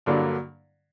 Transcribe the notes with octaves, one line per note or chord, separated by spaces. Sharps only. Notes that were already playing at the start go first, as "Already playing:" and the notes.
G2 D3 F#3 A#3 D4